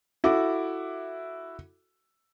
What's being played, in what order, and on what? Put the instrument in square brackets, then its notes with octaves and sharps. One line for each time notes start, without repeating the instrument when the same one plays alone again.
[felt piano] E4 F#4 A4 D6